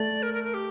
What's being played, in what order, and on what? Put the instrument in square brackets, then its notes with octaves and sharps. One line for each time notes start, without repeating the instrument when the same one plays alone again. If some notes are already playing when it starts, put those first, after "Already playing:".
Already playing: [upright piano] A3 [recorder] D5
[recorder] A#4
A#4
A#4
G4